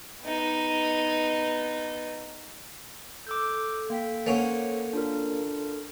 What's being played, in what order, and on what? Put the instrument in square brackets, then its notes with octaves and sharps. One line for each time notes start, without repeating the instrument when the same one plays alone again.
[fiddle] B3 D#4
[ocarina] A4 [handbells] D6 E6 G6
[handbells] A#3 G5 B6
[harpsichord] A#3 C#4 [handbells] C5 C#5 F#5
[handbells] D4 F4 A#4